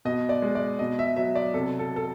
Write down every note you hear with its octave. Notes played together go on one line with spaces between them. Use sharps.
B2 D#5
D5
G#3
D5
B2 D#5
E5
F#3 E5
D5
C3 A4
A4
A4